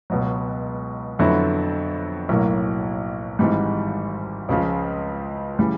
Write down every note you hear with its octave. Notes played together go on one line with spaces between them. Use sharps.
C#2 B2 F#3
F2 D3 F#3 B3 E4
B1 A2 F#3 A#3
G#1 G#2 E3 G3
C#2 C#3 F3
C#3 E3 G3